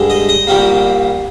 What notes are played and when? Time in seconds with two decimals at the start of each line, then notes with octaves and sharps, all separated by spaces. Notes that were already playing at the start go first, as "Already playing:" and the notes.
Already playing: G2 D3 G#3
0.10 D#5
0.29 D#5
0.47 C2 A#2 G3 A#3